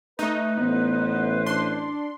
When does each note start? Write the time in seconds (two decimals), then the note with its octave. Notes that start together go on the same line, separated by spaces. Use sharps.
0.19 A3 D#4 B4
0.57 A1 B3 C5
1.46 D4 C6